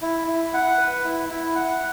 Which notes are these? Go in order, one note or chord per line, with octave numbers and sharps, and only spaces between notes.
E4
E4
F#5
B4
E4
E4
F#5